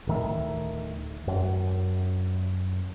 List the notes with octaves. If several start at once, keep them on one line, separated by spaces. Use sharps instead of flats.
D1 D#3 A3
F#2